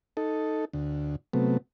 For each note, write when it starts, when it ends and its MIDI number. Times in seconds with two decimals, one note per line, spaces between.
0.17 0.65 63
0.17 0.65 69
0.73 1.16 38
1.33 1.57 48
1.33 1.57 54
1.33 1.57 57
1.33 1.57 59